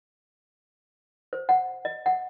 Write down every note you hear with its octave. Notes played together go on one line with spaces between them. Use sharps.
C5
F#5
D#5
F#5